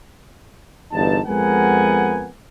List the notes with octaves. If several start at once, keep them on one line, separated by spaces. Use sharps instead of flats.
G1 E2 G2 D#4 A5
F2 G#3 B3 A#4 F#5 G#5